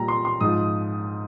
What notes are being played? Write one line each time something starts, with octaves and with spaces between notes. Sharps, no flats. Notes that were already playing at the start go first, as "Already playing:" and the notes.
Already playing: A#2 G3 A#5
C6
C6
G#2 F3 D#6